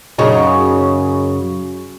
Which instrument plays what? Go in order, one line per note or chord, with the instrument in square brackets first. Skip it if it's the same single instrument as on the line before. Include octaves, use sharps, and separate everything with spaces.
[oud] F#2 C#3 D#4